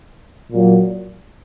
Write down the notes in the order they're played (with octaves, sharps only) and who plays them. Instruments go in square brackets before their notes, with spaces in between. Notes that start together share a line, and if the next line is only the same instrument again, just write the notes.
[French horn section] A#2 F#3